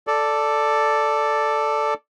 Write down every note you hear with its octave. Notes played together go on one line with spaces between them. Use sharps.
A4 D5